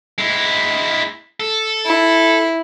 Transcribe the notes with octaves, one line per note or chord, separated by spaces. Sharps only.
G#3 E4
A4
E4